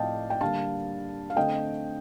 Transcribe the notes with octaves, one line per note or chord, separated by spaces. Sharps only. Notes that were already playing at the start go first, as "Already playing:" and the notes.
Already playing: A2 F3 C4 D5 D#5 F5 G5 A5
G5
D3 G3 A#3 F5 A5
F5
D3 A3 C4 D#5 G5